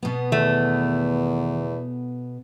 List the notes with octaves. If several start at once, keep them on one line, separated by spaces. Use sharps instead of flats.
B2 B3
E2 D#3 A3